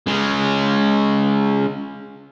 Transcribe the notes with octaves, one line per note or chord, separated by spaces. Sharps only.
C#3 G#3